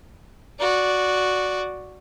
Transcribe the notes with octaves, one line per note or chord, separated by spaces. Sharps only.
F#4 D5